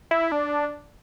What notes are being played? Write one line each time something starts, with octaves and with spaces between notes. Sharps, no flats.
E4
D4